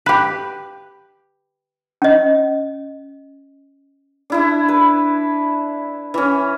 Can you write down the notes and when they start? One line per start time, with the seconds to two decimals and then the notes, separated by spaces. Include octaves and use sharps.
0.06 G4 B4
2.02 C#4 D#5
4.30 D4 E4 E5
4.69 B4
6.14 E3 C#4